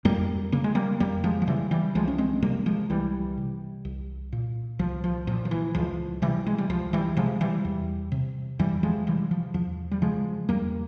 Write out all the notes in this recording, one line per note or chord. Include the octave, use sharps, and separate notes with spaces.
F2 G3 A#3
C#3 A#3
G#3
G3 A#3
F2 G3 A#3
F3 G#3
F3
C#3 E3 G3
E3 G3
C2 F3 G#3
C#4
G#3 C4
C3 G3 A#3
F3 G#3
C2 E3 G3
C3
C2
A#2
C2 F3
F3
A#2 F3
F3
E3
C#2 F3
C3 E3 G3
G#3
G3
C#2 F3
E3 G3
C3 F3 G#3
E3 G3
E2
C3
E2 E3 G3
F3 G#3
C3 E3 G3
F3
E2 F3
G3
C#3 F3 G#3
E2 G3 A#3